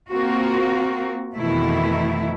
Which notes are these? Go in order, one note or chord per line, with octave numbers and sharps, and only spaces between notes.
A#3 C4 F4 F#4
F2 B2 D#3 E3 A3 E4